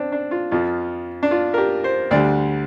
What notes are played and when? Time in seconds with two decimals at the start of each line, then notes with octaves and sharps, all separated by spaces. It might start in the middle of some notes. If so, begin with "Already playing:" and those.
Already playing: C4 D4
0.12 D4
0.31 F4
0.51 F2 F3 F4
1.23 D4
1.31 F4
1.54 A#4
1.58 G4
1.84 C5
2.11 D2 D3 G3 D5